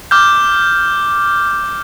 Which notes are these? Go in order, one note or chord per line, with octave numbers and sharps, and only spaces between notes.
D6 F6 G6